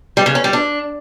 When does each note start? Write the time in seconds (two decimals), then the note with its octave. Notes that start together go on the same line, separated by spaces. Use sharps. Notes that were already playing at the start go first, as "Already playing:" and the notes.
0.17 G3
0.26 C#3
0.35 C#4
0.44 G3
0.53 D4